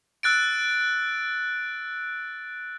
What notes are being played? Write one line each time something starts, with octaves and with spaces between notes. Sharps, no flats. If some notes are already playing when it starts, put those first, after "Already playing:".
E6 F#6 A6 D7